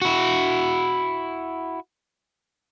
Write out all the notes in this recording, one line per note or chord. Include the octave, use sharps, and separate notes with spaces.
E4 F#4